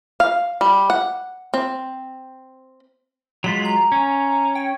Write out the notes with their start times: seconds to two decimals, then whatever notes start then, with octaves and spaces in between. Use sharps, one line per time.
0.20 F5
0.61 G3
0.90 F#5
1.54 C4
3.44 F#3 G#3 F4 B6
3.65 A#5
3.92 C#4
4.55 G5